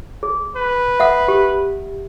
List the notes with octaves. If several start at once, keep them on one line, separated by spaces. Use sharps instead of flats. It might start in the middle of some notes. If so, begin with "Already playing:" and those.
G#4
B4
E5 F#5 D#6
G4